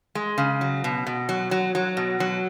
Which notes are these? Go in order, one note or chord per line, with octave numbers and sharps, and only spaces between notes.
G#3
C#3
F#3
B2
B2
F#3
F#3
F#3
B2
F#3